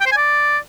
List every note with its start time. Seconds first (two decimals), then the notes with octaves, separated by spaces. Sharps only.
0.01 G5
0.06 C5
0.12 G#5
0.17 D5